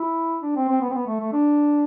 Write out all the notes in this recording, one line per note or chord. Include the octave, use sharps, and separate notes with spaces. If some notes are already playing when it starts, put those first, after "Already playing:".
Already playing: E4
D4
C4
C4
B3
C4
B3
A3
A3
D4